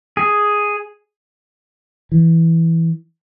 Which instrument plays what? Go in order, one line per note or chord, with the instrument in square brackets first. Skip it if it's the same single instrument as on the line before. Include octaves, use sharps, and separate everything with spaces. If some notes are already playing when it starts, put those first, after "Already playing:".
[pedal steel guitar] G#4
[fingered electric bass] E3